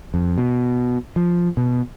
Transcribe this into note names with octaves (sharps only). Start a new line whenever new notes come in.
F2
B2
F3
B2